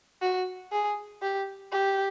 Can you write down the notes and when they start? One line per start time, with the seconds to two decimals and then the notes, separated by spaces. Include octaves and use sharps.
0.22 F#4
0.72 G#4
1.22 G4
1.72 G4